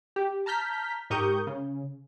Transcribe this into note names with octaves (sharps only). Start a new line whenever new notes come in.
G4
A5 A#5 F6 G6 B6
G#2 G4 A#4 C#6 D#6 G6
C#3